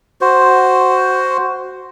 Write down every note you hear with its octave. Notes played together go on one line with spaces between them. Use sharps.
F#4 C5